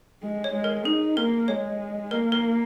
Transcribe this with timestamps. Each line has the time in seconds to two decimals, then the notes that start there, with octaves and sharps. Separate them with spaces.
0.22 G#3
0.44 C#5
0.54 G#3
0.64 A#4
0.85 D#4 G#4
1.17 A#3 A#4
1.48 G#3 C#5
2.11 A#3 A#4
2.32 A#4